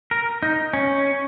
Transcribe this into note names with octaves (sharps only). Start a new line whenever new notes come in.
A#4
D#4
C#4